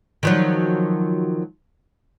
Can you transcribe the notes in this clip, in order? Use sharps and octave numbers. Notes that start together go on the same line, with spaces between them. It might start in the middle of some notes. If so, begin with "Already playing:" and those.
D#3 F3 F#3